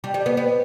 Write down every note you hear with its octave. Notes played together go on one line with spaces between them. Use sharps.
G3
G3
B3
B3